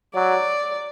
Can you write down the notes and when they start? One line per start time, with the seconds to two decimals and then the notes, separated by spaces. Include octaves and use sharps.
0.15 F#3 D5